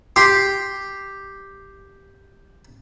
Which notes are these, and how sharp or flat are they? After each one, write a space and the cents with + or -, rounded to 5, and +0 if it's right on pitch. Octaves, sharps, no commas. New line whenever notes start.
G4 +0 C6 +0